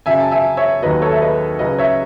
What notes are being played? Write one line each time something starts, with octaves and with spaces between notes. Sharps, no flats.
F#2 C#3 F#3 E5 G#5
A5
E5 G#5
C#5 E5
D#2 D#3 F#3 B4 D#5
A4 C#5
E5
B4 D#5
C#2 C#3 F#3 C#4 B4 D#5
C#5 E5